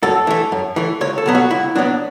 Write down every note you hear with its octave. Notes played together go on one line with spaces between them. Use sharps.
F#2 A4
E3 A3
F#2
E3 A3
C#2 C#5
A4
B2 F#3 B3
F#4
C#2 E4
B2 F#3 B3 D4